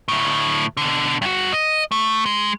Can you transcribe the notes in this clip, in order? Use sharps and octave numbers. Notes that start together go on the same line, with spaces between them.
D2 A2
B2 D3
G2 F#4
D#5
A3
G#3